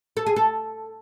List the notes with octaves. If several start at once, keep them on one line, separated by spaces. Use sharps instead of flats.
A4
G#4
A4